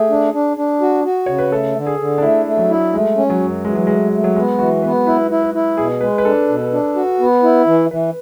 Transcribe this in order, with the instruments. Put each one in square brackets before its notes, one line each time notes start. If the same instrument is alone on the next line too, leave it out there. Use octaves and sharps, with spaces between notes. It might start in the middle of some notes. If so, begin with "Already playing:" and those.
Already playing: [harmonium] A3 [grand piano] G#4
[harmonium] D4
D4
D4
F#4
F#4
[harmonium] C#3 [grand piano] C#5
[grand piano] B4
[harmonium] A3 [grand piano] A4
[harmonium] D3
[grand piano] G#4
[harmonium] D3
[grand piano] D4
[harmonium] A3 [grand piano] E4
[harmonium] A3
[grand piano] F#3
[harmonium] E4
[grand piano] G#3 [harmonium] A3
[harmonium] C#4
[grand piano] F#3
[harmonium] F#2
[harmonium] E3 [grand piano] G#3
[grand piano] F#3
[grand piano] G#3 [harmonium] A3
[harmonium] A3
[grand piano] F#3
[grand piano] G#3 [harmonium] B3
[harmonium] E3 [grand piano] F#4
[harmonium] B3 [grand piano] B4
[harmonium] E4 [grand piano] B4
[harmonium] E4
[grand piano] B4
[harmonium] E4
[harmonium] B2 [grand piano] G#4
[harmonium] G#3 [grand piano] B4
[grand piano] B4
[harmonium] D4 [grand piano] A4
[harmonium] B2
D4
F#4
B3
E4
E3
[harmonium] E3 [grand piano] B4